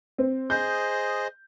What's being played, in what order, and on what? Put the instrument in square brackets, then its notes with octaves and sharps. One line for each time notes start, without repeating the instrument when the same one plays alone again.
[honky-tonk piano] C4
[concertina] G#4 C5 D#5 [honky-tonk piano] G6